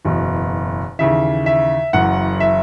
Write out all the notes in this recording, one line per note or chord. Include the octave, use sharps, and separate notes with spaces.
F#1 E2 B2
D#2 C#3 E3 E5
E5
F#1 F#2 E3 F#5
E5